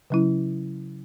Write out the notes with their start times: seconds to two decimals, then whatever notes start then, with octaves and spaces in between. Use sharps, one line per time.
0.10 C#3 F#3 C#4 E4